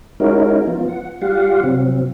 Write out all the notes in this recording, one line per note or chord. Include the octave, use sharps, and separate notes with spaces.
G#3 C#4 D#4 E4 F#4 A#4
F3 B3 F4
F#5
G3 F4 G4 F5 F#5
C3 F#3 C4